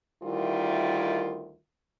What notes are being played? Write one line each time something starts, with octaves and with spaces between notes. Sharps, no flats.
D2 D#3 G3 E4 F4 A#4